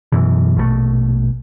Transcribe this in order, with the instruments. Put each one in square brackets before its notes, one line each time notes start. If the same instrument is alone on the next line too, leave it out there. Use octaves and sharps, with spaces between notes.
[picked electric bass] F#2 B2 E3
A#1 B2 F3 A3